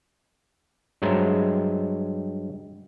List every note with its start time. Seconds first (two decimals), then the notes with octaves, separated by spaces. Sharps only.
1.02 G2 F#3 G#3 A#4 C5 E5